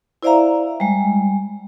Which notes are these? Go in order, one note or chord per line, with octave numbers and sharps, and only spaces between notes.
E4 C5 D5 E5 F5 A#5
G3 G#3